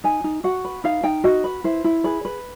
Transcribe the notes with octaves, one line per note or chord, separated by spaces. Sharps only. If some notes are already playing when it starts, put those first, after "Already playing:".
D#4 G#5
D#4
F#4 F#5
B4
D#4 F5
D#4 G5
F#4 D#5
B4
E4 C5
E4
G#4 B4
B4